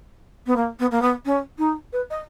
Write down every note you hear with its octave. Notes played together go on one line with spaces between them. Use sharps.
B3
A#3
B3
A#3
B3
C#4
D#4
B4
D#5